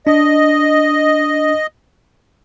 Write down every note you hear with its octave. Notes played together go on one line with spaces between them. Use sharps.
D4 D#5